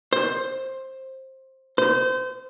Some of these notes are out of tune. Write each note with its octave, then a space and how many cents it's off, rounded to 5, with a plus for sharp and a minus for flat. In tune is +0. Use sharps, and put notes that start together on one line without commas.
C5 +15
C5 -30